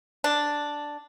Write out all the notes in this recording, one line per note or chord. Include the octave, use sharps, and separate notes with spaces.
D4